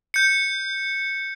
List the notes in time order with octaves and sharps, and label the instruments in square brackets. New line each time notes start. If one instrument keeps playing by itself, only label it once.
[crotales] G6 C#7